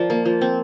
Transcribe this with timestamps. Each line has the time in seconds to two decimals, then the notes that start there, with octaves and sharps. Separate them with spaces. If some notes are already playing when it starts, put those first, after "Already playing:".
Already playing: F3 A#4 D5
0.10 A#3
0.25 F3
0.41 C4